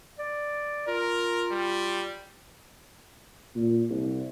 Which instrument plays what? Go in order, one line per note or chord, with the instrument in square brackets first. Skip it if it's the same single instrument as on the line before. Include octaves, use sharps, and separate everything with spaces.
[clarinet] D5
[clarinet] F4 [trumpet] A#4
[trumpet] G3
[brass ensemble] A#2
C2